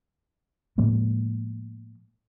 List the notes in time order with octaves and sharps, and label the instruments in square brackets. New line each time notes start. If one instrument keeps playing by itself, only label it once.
[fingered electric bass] A2 F3 G#3 A#3